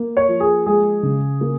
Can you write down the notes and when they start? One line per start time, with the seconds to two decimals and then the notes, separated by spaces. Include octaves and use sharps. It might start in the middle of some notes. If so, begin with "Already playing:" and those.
Already playing: A#3
0.17 C#5
0.29 F3
0.40 G#4
0.66 G#3 G#4
1.03 C#3
1.41 A#3